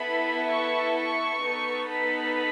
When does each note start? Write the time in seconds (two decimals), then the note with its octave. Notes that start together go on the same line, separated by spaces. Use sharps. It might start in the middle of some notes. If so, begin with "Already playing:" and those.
Already playing: B3 E4 A4 B5
0.49 C#6
0.96 C#6
1.42 B3 D#4 A4
1.90 B5